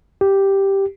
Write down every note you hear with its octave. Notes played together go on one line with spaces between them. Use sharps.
G4